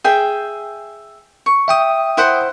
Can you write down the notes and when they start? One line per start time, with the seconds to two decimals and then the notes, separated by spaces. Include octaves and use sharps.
0.04 G#4 E5 G5
1.46 C#6
1.68 E5 G5 D#6
2.17 E4 C5 F#5